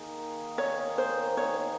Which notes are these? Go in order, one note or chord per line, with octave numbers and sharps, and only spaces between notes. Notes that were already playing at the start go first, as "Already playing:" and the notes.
Already playing: D#3 A#3 D#4 G#4
C#5
C5
C#5